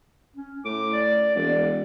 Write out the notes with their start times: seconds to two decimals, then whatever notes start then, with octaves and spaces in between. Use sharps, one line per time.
0.36 C#4
0.65 A2 D6
0.93 D5
1.35 E1 D5